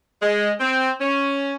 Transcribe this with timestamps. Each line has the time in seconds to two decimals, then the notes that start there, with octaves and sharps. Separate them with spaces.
0.22 G#3
0.60 C4
1.01 C#4